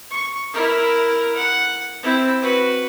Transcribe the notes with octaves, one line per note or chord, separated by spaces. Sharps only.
C#6
E4 A#4
F#5
C4 E4
F#4 B4